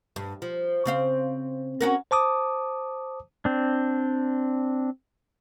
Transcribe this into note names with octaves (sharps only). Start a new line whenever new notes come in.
G2
F3
C#3 C4 F5
C#4 F#4 A#4
C5 A5 D6 D#6
C4 D4